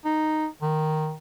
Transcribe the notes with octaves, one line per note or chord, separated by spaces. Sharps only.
D#4
D#3